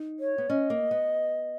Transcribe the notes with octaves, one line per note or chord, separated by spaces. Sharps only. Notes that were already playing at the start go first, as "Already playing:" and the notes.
Already playing: D#4
C#5
B3
C#4 D#5
A#3
B3